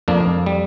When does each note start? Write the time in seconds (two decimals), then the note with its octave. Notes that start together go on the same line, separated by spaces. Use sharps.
0.08 F2 A#3 D4
0.46 G3